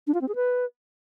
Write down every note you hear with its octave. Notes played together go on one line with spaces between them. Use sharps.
D4
F4
C4
G#4
B4